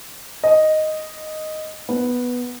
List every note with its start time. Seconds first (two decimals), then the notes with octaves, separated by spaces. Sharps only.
0.44 D#5
1.89 B3